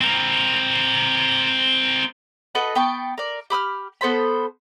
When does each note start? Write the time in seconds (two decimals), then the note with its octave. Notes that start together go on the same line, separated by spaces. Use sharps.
0.01 C4 A#4
2.55 F#4 A4 B4 D#5
2.75 B3 G5 A5 C#6
3.18 A#4 D5
3.50 G4 B5 D#6 F6
4.01 B3 A4 C5 B5